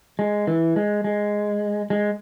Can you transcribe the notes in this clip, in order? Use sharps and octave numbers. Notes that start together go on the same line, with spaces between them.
G#3
E3
G#3
G#3
G#3